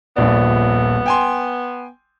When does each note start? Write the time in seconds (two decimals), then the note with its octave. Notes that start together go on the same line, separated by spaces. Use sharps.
0.16 D#1 A#1 B3 D5
1.06 G5 G#5 C6